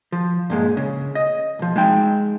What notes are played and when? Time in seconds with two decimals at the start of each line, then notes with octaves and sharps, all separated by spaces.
0.12 F3
0.50 G2 A#2 G#3
0.77 C#3
1.15 D#5
1.59 B1 F3
1.76 G#3 D#4 G5